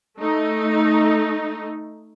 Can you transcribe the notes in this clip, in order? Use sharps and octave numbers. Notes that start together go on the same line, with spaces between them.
A3 D#4